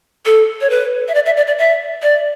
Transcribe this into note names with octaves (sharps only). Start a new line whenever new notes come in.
A4
C#5
B4
E5
D5
E5
D5
D5
E5
D5